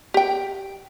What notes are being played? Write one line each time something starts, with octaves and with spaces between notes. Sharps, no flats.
G4 G5